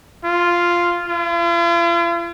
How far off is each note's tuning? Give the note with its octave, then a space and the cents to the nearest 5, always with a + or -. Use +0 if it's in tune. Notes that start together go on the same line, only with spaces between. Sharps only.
F4 -5
F4 -45